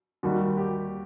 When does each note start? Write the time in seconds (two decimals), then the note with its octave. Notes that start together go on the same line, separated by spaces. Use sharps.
0.23 D#2 D#3 G3 F#4
0.57 G4